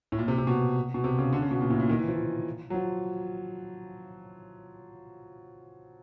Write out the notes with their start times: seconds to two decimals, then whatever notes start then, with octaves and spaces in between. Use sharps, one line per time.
0.12 A2
0.19 A#2
0.28 C3
0.38 C3
0.47 B2
0.94 B2
1.04 C3
1.19 C#3
1.33 D3
1.42 C#3
1.51 B2
1.61 A#2
1.70 A2
1.80 A#2
1.89 D#3
1.99 E3
2.08 F3
2.70 F#3
2.74 F3